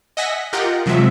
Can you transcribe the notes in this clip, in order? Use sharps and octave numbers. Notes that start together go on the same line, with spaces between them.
D#5 E5 F#5 G#5 A#6 B6
F4 G4 A#4 D#5 F#5 G5
C3 F3 F#3 G#3 E5